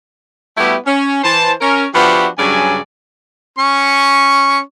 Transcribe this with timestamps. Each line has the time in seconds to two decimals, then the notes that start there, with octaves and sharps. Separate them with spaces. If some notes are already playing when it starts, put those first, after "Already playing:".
0.57 G3 A3 B3 E4 F#4 G4
0.86 C#4
1.24 E3 C5 A5
1.61 C#4 A#4
1.95 F3 B3 D4 F#4 G4 E5
2.38 G2 C#3 F#3 D5 G#5
3.58 C#4 C#6